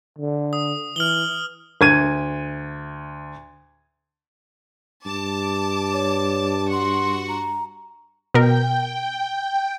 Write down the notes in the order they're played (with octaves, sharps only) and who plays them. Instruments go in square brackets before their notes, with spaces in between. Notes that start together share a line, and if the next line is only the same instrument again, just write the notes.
[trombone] D3
[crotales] D#6
[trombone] E3 [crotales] F6 F#7 G7
[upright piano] D2 G#6 D#7
[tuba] G2 [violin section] A5 D6
[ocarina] C#5
[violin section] F#4 F#5 C#6 [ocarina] C6
[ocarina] A#5
[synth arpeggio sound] B2 A#4 [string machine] G5